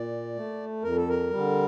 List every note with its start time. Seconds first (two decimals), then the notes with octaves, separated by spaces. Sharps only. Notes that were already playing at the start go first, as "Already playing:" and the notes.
Already playing: A#2 D5
0.36 A3
0.83 F2 A#4
0.96 A4
1.09 A#4
1.31 D3 G3